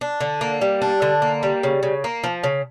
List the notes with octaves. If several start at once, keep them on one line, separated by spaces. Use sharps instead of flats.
D4
D3
A#3
G3
D4
D3
A#3
G3
C#3
C#3
A#3
F3
C#3